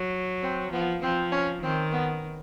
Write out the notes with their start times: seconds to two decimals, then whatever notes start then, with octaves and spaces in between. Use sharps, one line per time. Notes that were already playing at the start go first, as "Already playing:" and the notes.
Already playing: F#3
0.43 C4
0.72 F3 B3
1.02 F3 C4
1.32 C#4
1.63 D#3 C4
1.92 B3